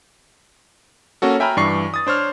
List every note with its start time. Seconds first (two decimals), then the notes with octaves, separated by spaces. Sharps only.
1.22 A#3 C#4 F#4 A4
1.40 E5 G5 G#5 A#5 B5 F6
1.57 G2 E3 D5 C#6 C7
1.94 D#6 A6
2.07 D4 C5 C#5 F6